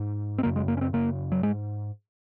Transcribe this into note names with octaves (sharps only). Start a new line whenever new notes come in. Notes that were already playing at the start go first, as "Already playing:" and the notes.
Already playing: G#2
C4
F#2 C#3 A#3
G#3
A#3
C#4
C4
F#2 C#3 A#3
F#3
G#2 G#3